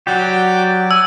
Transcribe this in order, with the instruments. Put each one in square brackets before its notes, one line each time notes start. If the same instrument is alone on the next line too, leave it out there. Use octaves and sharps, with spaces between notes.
[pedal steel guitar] F#3 G4 [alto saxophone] F#4 [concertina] D5 G5 D6
[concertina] G#5 [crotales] E6